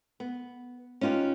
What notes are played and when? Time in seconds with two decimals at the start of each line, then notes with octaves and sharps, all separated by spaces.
0.20 B3
1.01 C#4 D#4 F4 G4 B4